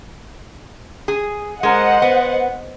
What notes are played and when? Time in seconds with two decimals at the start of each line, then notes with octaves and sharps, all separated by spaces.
1.08 G#4
1.63 G#3 A#4 C5 D#5 F#5
2.02 B3